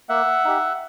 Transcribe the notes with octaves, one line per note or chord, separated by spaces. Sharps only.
A#3 E5 F#5
D#4 G4